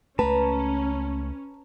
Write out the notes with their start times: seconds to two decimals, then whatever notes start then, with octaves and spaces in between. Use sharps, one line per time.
0.19 C#2 A3 C#4 B4 A5 A#5